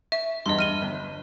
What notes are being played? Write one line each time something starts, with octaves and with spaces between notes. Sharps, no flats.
E5
E2 G2 D#5 C6
G2 F6 D#7 G7
G1